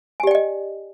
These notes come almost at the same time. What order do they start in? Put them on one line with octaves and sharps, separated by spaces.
G#5 G4 D5 G5 D#5